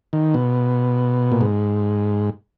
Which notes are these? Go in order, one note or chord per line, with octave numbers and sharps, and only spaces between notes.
D#3
B2
A#2
G#2